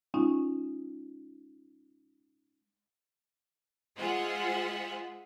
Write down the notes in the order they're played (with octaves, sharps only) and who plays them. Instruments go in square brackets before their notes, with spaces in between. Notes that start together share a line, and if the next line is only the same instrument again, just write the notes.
[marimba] G#3 C#4 D#4 F4
[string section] G#3 F4 G#4 C5 E5 F#5